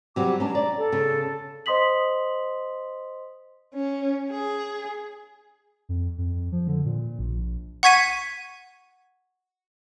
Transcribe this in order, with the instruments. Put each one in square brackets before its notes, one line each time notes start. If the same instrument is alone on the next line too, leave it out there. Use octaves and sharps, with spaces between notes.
[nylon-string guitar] C3 F#3 G3 [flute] D6
[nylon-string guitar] C#4 D4 [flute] A#5
[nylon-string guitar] D5
[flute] A4
[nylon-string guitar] C#3
[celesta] C5 D#5 C6 D#6 B6 F#7
[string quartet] C#4
G#4
[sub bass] F2
F2
F3
D3
A#2
A#1
[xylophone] F#5 C#6 G#6 B6 D#7